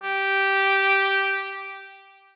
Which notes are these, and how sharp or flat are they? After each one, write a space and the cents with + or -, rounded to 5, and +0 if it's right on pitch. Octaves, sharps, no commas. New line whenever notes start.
G4 -10